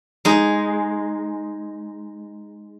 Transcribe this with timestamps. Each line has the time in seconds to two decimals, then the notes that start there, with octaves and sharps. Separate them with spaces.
0.25 G#3 D#4